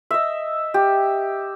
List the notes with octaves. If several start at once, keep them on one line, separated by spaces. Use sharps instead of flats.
D#5 E5
G4